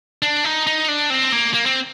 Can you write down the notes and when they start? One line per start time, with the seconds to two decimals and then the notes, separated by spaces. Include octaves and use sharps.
0.22 D4
0.45 D#4
0.67 D#4
0.88 D4
1.10 C4
1.32 A#3
1.54 A#3
1.66 C4